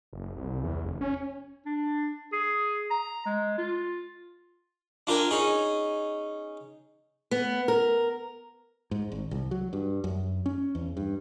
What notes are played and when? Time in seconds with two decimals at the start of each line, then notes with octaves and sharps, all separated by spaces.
0.13 F#1
0.37 C2
0.64 E2
0.85 F1
1.01 C#4
1.66 D4
2.33 G#4
2.91 A#5
3.26 G#3
3.58 F4
5.07 D4 F4 A#4 G5 G#5
5.31 C#4 D#4 G#4
7.31 B3
7.68 A#4
8.91 G#2
9.12 G#1
9.31 C2
9.51 F#3
9.73 G2
10.04 F#2
10.46 C#4
10.75 E2
10.97 G2